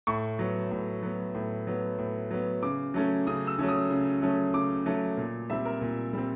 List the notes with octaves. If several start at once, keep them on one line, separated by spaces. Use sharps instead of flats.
A2 C#6
F#3 B3
A2
F#3 B3
A2
F#3 B3
A2
F#3 B3
C#3 D6
F#3 A3 C#4
C#3 D#6
E6
F#3 A3 C#4
D#6
C#3
F#3 A3 C#4
C#3 D6
F#3 A3 C#4
A#2
G3 C4 E5
A#4
A#2
G3 C4